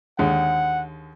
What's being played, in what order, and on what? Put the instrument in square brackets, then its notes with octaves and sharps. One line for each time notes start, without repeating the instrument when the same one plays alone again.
[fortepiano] D#2 D3 G#3 [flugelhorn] F#5